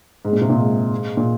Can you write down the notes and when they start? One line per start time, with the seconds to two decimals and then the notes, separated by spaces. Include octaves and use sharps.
0.25 G#2
0.33 A#2
0.41 C3
0.50 A#2
0.58 G#2
1.17 A#2